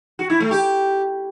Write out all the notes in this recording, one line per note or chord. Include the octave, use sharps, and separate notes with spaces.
F#4
E4
A3
G4